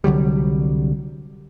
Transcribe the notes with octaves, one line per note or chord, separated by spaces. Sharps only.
C2 D3 F#3 G3